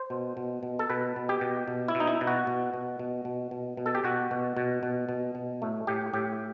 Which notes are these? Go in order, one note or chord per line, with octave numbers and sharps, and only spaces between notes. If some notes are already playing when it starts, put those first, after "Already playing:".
Already playing: C5
B2
B2
B2
A4
B2 B4
B2
G4
B2
B2
E4
B2
D#4
E4
B2
F#4
B2
B2
B2
B2
B2
B2
A4
G4
B2 F#4
B2
B2
B2
B2
B2
A2 A3
A2 G4
A2 G4